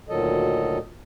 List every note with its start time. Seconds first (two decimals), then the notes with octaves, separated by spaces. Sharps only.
0.09 D2 A#2 D#3 F#3 A4 D#5